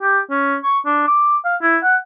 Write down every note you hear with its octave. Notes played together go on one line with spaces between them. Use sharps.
G4
C#4
C#6
D4
D6
F5
E4
F#5